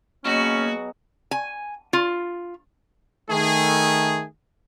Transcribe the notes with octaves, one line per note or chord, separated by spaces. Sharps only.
B2 F#3 A#3 C#4 F#4 G#4
G#5
F4
D#3 A3 G#4